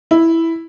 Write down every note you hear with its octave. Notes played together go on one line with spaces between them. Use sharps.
E4